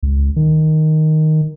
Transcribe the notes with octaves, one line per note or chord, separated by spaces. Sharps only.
C#2
D#3